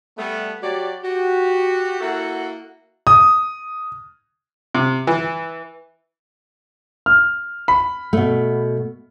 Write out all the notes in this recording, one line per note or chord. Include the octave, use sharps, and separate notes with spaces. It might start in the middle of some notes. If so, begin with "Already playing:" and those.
G3 A3 B3
F#3 F#4 G4 D5
F#4 G4
A#3 E4 F#4 A4 E5 F#5
D#6
C3
E3
F6
B5
B2 A3